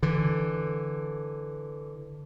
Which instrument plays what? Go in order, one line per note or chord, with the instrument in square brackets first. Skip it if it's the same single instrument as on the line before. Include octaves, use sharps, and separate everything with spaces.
[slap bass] D3 E3